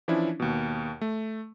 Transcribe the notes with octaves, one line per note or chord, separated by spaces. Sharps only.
E3 F3 C#4 D4 E4
D#2 B2
A3